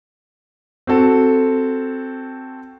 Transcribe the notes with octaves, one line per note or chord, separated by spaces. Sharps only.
C4 F#4 A4